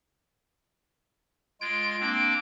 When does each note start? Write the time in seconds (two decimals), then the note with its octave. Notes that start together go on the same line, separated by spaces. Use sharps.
1.61 G#3 F4 G#6 D7
2.00 A#3 C4 D4